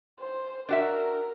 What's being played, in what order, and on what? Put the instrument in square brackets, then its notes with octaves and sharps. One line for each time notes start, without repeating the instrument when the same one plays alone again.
[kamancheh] C5
[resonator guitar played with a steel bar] D4 F#4 E5 [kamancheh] A#4